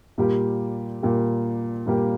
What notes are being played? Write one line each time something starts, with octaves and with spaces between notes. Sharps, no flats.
A#2 G3 A#3 G4
A#2 G3 A#3 G4
A#2 G3 A#3 G4